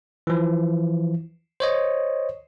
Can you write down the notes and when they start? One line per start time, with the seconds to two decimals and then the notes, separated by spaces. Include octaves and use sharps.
0.27 E3 F3
1.60 C5 C#5 D#5